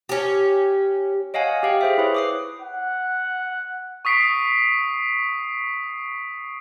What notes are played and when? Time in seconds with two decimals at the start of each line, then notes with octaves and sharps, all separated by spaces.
0.09 C#4 G4
1.34 C#5 D#5 F5 F#5 G#5
1.63 G4 F5 G5
1.81 G#4 C5 E5
1.98 E4 B4 C#5
2.15 D6 D#6 C7
2.62 F#5
4.05 C#6 D#6 B6 C7 D7